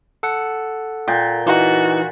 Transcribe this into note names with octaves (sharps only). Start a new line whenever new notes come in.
A4 F#5
A#2 G5
E3 D#4 F#4